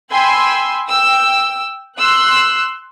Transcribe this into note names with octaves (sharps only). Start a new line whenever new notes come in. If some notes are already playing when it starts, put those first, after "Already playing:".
G5 G#5 B5 C6 E6
G5 E6
C6 E6 F#6